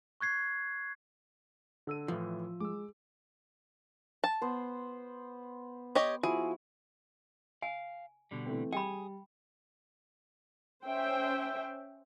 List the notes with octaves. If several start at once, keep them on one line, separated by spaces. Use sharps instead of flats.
C#6 F#6 G#6 C7
D3 A4 E6 D#7
A2 E3 F3
G#3 D6 E6
A5
B3 C5
G4 C#5 D#5
F3 E4 F#4 G#4
F5 G#5
B2 D3 G3
E3 A3 C4
G3 G#4 G5 B5
C#4 C5 E5 G5